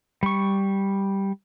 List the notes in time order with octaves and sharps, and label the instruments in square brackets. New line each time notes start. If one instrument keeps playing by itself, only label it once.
[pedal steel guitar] G3 C#6